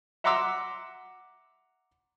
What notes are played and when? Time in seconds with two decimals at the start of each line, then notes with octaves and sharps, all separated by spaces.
0.24 E5 F#5 A#5 C6 D6 E6